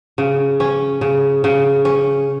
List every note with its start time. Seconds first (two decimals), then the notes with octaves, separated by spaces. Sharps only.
0.18 C#3
0.60 C#4
1.01 C#3
1.44 C#3
1.85 C#4